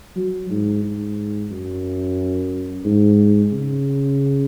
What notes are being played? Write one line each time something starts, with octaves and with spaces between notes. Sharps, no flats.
F#3
G#2
G#2
F#2
G#2
C#3